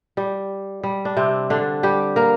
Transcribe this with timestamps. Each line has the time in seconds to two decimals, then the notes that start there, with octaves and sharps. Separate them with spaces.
0.17 G3
0.84 G3
1.05 D4
1.17 C3 C4
1.50 D3 D4
1.83 G3 G4
2.16 A#3 A#4